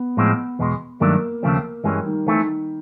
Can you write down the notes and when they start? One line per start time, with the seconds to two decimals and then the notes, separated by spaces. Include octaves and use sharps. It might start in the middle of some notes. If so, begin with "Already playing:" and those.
Already playing: B3
0.17 A2 F3 G#3 C4
0.59 E2 B2 G#3
1.00 G2 D#3 F#3 A3 A#3 D4
1.43 D#2 C#3 F3 A3 C4
1.84 G2 E3 G3 G#3 C#4
2.05 D#3
2.26 D#3 E3 A3 C4